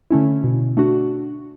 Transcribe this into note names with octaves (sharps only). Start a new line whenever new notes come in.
D3 A3 C#4 E4
B2
A3 D4 F#4